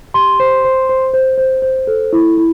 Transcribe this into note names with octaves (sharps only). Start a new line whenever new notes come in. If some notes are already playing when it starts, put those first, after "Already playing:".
G4 C6
C5
C5
C5
C5
C5
C5
A4
E4
E4